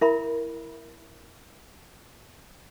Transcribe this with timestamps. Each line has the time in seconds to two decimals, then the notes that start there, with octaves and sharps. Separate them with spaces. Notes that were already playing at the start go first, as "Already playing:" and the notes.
0.01 E4 A#4 E5 B5